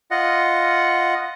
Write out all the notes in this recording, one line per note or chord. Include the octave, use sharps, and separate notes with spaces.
F4 D#5 F#5